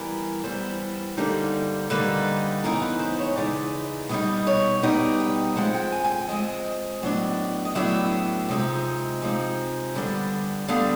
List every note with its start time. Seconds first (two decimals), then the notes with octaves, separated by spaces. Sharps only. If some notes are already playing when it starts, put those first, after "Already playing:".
Already playing: E3 G3 B3 A#4
0.44 E3 G3 B3 C5
1.17 D3 G3 A#3 D#4
1.90 D3 G3 A#3 D#4 B4
2.64 C#3 E3 G#3 B3 D#4 A#4
2.82 B4
3.00 C5
3.19 C#5
3.36 C#3 E3 G#3 B3 D#4 D5
4.09 B2 G3 B3 D#4 D#5
4.47 C#5
4.82 B2 G3 B3 D#4 D5
5.20 G5
5.56 F3 G#3 C4 F#5
5.75 G5
5.92 G#5
6.04 G#5
6.11 G5
6.29 F3 G#3 C4 D#5
7.02 A2 F#3 B3 D4
7.65 D#5
7.75 A2 F#3 B3 D4 E5
8.49 C3 F3 G#3 C4 D#4
9.22 C3 F3 G#3 C4 D#4
9.95 D3 G3 B3 D4
10.68 D3 G3 B3 D4 F5